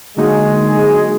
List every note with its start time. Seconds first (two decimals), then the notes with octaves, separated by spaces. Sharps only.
0.17 D3 F#3 G#3 A#3 D#4 F#4